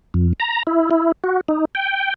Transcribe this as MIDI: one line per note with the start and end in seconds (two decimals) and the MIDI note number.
0.14 0.33 41
0.40 0.63 82
0.67 0.90 64
0.91 1.12 64
1.24 1.41 66
1.48 1.65 63
1.75 2.14 79